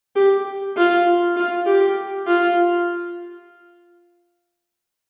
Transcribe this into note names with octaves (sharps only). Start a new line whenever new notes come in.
G4
F4
F4
G4
F4